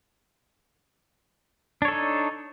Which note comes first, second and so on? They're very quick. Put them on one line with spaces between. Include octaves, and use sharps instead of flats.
D4 C#5 A4 D#4